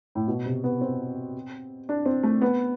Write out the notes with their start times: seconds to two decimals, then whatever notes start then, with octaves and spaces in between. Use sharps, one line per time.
0.15 A2
0.27 B2
0.46 C3
0.64 B3
0.81 C4
1.89 D4
2.06 C4
2.23 A3
2.41 B3